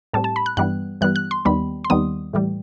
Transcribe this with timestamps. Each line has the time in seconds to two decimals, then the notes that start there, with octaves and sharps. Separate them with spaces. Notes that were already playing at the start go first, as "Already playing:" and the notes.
0.13 A2 G3 C4 A5
0.24 A5
0.36 B5
0.46 F#6
0.57 G2 E3 G3 B3 F#6
1.01 G2 E3 G3 B3 F#6
1.16 F#6
1.31 C6
1.45 D#2 D#3 G3 B3 B5
1.85 C6
1.90 D#2 D#3 G3 B3 D#6
2.33 A2 E3 G3